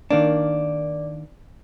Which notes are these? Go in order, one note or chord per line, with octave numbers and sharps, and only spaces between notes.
D#3 A#3 D4 D5